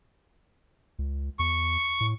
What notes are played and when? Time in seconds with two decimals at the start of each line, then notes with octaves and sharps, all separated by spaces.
0.99 C#2
1.39 E2 C#6
2.01 A2